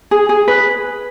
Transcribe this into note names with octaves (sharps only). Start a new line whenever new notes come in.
G#4
G#4
B4